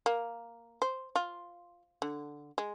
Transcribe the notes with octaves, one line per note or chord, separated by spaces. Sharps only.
A#3
C5
F4
D3
G#3